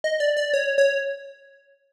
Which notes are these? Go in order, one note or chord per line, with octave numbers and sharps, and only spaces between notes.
D#5
D5
D5
C#5
C#5